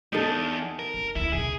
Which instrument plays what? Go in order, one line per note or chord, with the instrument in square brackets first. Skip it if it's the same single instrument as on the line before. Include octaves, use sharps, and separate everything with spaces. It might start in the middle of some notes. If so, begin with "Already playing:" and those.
[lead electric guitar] E2 G#2 [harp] D#4 A4
[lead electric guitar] A#4
[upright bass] F1
[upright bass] D2 A3 [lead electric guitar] E4
[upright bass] C3 A#3 [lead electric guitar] G#4